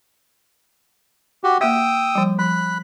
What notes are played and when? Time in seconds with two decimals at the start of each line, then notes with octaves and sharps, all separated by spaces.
1.44 F#4 G4
1.61 A#3 E5 G5 D#6 E6
2.15 F3 G3
2.39 F3 B5 F#6